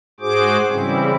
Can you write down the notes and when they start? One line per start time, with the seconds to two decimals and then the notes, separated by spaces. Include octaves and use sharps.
0.20 G#2 F#4 G#4 C5 D6
0.69 C#3 E3 G3 C4 E4